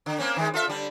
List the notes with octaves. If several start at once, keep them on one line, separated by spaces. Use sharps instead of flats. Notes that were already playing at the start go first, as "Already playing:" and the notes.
D3
A#3 C4 C#4
D#3 G#3
F4 A4 E5
D3 G3